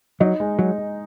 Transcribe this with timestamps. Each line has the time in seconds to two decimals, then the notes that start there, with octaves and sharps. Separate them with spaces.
0.20 F#3 D#4
0.40 G#3
0.59 F#3 G#3
0.78 G#3